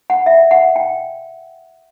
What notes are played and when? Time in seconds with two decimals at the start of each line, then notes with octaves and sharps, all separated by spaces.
0.10 F#5
0.26 E5
0.51 F#5
0.76 G5